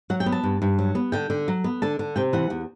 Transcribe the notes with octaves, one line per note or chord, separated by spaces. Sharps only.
F#3 F#5
G5
B3
A5
G2
G2
F#3
B3
D3 G5
D3
F#3
B3
D3 A5
D3
C3 G5
E3 F#5
E2